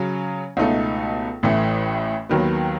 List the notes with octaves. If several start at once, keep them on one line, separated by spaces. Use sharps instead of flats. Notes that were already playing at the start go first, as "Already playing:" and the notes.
Already playing: C#3 F#3 C#4
C#2 B2 A3 D#4 A4
A1 A2 E3 A3
D#2 D#3 F#3 B3